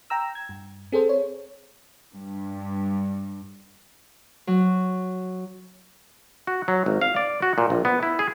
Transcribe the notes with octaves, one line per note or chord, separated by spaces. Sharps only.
G5 A#5 E6
G#6
G2
C4 G#4 A4 C5
C#5
G2
F#3
F#4
F#3
G#1
F5
D5
F#4
A#2
A#1
B3
E4
G#4